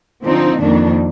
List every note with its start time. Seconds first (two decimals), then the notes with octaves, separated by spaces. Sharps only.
0.24 D3 F3 C4 D#4
0.60 F2 D#3 A#3 D4